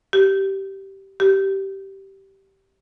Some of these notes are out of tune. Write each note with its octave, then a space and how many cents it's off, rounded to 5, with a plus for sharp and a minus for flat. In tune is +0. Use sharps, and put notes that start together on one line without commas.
G4 -15
G4 -15